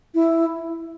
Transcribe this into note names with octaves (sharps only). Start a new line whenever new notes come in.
E4